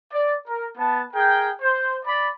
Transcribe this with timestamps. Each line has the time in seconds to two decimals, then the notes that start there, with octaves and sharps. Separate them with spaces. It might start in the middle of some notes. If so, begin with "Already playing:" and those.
0.12 D5
0.48 A#4
0.77 B3 A5
1.13 G#4 A#4 G5
1.61 C5
2.05 D5 B5